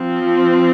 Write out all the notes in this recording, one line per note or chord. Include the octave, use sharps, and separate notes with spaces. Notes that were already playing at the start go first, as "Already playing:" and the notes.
Already playing: F3 C4